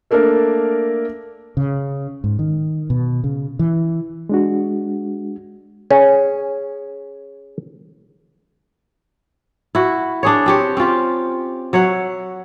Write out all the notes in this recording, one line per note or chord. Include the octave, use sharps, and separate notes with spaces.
A3 A#3 D4 A4 A#4
C#3
G#2
D#3
B2
C#3
E3
G#3 D4 F#4
C#4 G#4
E4 F#4
D4 G#4 C#5
C4 G4 C#5
C4 C#4 F4 G4
F#3 C#5 E5 F#5